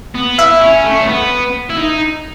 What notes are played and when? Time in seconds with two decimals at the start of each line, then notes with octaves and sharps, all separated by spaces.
0.15 B3
0.39 E4 E5
0.61 C#4
0.84 A3
1.02 C#4
1.07 B3
1.70 E4
1.77 D#4